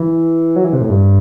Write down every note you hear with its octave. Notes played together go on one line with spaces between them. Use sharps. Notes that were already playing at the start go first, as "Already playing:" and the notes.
Already playing: E3
F#3
E3
C3
A2
G2